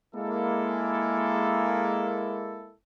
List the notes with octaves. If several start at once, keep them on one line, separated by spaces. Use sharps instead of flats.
G#3 A#3 E4 A4